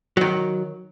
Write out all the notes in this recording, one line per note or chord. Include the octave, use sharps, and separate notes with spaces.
D#3 F#3